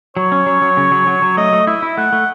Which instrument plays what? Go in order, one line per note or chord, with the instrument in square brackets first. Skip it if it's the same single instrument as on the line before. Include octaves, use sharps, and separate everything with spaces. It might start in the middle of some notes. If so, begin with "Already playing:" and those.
[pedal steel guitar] F#3 [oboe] C#5
[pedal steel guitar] C#4
F#3
F#3
C#3
F#3
F#3
F#3
[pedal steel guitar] A3 [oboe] D#5
[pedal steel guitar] A3
[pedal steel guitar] E4 [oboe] E5
[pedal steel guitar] E4
[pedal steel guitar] A3 [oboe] F#5
[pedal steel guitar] A3